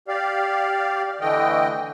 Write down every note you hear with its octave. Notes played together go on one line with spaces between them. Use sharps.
G4 D5 F5
D3 E3 A3 D#5 G5